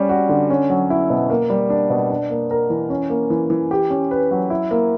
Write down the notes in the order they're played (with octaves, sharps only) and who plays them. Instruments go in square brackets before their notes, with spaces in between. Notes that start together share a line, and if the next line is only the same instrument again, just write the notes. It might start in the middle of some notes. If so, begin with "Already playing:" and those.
Already playing: [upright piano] G3 C#4
F#4
D3
C#4
F#3
E4
B2
A#3
G3
D4
B2
D4
A#3
A#4
E3
C#4
A#3
E3
E3
G4
C#4
B4
F#3
E4
A#3